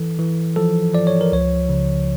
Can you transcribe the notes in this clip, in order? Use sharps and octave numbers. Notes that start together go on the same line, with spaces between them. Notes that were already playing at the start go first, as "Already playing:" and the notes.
Already playing: E3 A4
E3
F3 A4
F3 D5
C#5
A#4
C#2 C#5
C#3